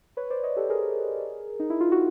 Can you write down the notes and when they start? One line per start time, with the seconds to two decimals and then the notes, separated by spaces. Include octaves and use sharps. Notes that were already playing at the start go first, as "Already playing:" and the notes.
0.17 B4 C#5
0.30 C5 D5
0.43 C#5 D#5
0.57 G4 A4
0.70 G#4 A#4
1.60 D#4
1.70 E4
1.81 F4
1.92 F#4